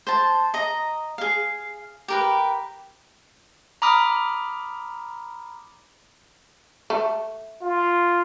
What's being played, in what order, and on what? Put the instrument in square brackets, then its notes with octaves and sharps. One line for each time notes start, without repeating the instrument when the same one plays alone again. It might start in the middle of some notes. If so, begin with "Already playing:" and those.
[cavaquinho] C5 A5
D#5 A#5
G#4 F5
G4 A#4 B4
[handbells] A#5 B5 D6 D#6 F6
[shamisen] A3
[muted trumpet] F4